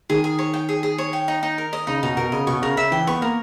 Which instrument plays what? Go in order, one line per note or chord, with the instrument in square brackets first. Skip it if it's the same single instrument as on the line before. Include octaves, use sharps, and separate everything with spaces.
[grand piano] D#3 [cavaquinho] G#4
[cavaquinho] G#4
C#5
G5
G#4
G#4
C#5
G5
D#4
D#4
A#4
D#5
[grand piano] C#3 [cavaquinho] D#4
[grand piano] B2 [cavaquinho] D#4
[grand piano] B2 [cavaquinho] A#4
[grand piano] C#3 [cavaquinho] D#5
[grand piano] B2 [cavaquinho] C#6
[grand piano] C#3 [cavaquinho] A#4
[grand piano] C#3 [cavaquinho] E5
[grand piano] E3 [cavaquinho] G5
[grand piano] B3 [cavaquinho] C#6
[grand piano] A#3 [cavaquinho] A#4